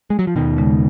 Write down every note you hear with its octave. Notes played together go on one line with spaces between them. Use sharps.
G#3
F#3
F3
D#2 B2 D#3
C#3 G#3